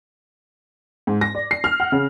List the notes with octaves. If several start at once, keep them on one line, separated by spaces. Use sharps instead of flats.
G#2
A#6
D5
C7
F6
F#5
C#3